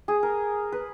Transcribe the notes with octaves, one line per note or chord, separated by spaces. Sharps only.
G#4
A#4
B4